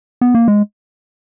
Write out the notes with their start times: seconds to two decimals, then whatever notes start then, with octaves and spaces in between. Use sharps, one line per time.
0.21 B3
0.35 A#3
0.48 G#3